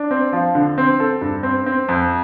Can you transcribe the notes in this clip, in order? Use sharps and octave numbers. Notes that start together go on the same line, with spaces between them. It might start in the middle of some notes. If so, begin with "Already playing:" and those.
Already playing: D4
C4
F3
D3
C4
A4
G2
C4
C4
F2